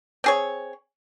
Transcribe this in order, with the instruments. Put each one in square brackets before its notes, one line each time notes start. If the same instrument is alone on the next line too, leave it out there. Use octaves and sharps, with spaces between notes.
[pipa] C4 G#4 C#5